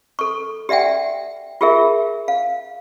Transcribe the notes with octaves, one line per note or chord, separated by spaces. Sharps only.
A4 C#6
G4 D5 E5 F#5 G5
F4 G4 G#4 A#4 E5
F5